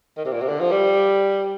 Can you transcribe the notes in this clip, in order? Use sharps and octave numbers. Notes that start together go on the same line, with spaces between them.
D#3
C3
A#2
C3
D3
F3
G3